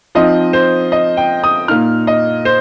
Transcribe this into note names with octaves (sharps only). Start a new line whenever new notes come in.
F3 C4 D#4 D#5
C5
D#5
G5
D#6
A#2 A#3 D#4 F6
D#5
C5